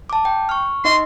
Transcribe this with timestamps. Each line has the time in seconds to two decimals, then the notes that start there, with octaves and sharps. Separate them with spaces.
0.10 A5 D6
0.25 G5
0.49 C#6 F6
0.85 D#4 D#5 E5 C6